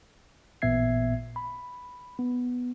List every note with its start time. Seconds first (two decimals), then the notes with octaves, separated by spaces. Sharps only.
0.62 A1 A#2 B3 E5 G#6 C7
1.36 B5
2.19 B3